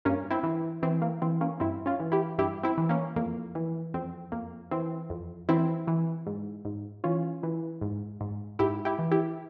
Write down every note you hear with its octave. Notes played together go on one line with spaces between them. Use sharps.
G2 A#3 C#4
C4 E4
E3
E3 C4
A#3
E3 C4
A#3 C#4
G2 C4 E4
C#4 F4
E3
E4 G4
G2 E4 G4
C4 E4
E3
A#3 C#4
F2 A#3
E3
F2 C4
F2 A#3
E3 C4
F2
E3 C4 E4
E3
G#2
G#2
E3 C#4 F4
E3
G#2
G#2
G#2 E4 G4
E4 G4
E3
E4 G4